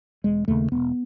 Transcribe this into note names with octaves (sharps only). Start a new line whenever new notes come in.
E1 G#3
D#2 C#3 A3
E1 B3